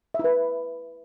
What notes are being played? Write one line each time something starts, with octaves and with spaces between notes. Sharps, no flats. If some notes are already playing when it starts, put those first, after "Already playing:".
E4 B4 E5